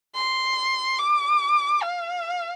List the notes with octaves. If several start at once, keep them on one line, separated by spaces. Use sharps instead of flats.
C6
D6
F5